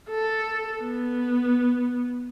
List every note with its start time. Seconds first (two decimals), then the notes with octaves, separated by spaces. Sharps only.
0.10 A4
0.83 B3